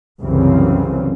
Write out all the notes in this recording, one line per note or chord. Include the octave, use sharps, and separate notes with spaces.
C2 F#2 C#3 E3 C4